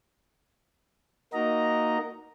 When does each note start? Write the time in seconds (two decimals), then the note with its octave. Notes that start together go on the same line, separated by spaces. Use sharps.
1.33 A#3 D#4 F#4 A#4 D#5 A#5